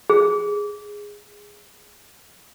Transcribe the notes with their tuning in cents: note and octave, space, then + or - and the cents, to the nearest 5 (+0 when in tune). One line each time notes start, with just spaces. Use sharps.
G#4 -15